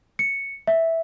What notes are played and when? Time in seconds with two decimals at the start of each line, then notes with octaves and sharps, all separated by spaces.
0.19 C#7
0.67 E5